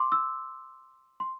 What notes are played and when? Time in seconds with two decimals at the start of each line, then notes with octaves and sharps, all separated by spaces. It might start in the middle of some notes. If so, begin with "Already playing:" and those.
Already playing: C6 D6
0.12 E6
1.20 C6